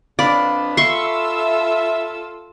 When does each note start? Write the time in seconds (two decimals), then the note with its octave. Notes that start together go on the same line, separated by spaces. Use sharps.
0.19 F2 B3 D4 D5 F5 B5
0.77 F4 A4 E5 C6 C#6 E6